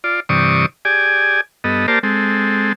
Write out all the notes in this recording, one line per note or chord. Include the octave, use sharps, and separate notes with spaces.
F4 D5
G2 C3 E3 D5 C#6 D#6
G4 G#4 D5 G#5
G2 B3 A4 D#5
A#3 G4 A#4 C5 D5 A5
G#3 C4 A4